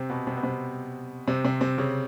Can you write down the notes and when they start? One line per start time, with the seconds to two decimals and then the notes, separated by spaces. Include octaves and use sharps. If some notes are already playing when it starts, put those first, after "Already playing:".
Already playing: C3 C4
0.10 B2 B3
0.27 C3 C4
0.37 B3
0.43 C3 C4
1.28 C3 C4
1.45 C3 C4
1.61 C3 C4
1.78 C#3 C#4